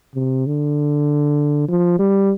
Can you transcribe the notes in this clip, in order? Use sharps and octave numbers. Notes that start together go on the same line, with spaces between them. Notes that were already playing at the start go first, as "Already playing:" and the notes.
C3
D3
F3
G3